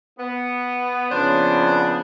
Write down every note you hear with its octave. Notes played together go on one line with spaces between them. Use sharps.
B3
F2 C#3 B3 D4 C5